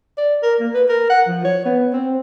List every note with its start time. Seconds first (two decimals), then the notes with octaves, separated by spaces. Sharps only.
0.18 D5
0.42 A#4
0.60 A#3
0.74 B4
0.88 A#4
1.09 F#5
1.27 F3
1.44 C#5
1.65 B3
1.93 C4